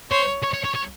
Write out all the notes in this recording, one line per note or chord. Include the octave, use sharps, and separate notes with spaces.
C5 C#5
C#5
C#5
C#5
C#5